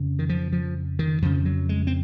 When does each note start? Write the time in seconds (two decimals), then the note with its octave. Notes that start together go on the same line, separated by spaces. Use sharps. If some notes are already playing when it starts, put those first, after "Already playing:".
Already playing: F2 C#3
0.19 D#3
0.29 F3
0.52 F3
0.99 D#3
1.22 F2 C#3 F3
1.45 F#3
1.69 G#3
1.87 C4